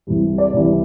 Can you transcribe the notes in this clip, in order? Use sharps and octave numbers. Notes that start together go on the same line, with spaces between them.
C2 C3 E3 G3
D5
C2 C3 E3 G3